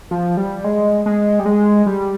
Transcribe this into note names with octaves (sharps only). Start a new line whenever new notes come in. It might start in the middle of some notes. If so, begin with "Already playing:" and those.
F3
G3
G#3
G#3
G3
G#3
G3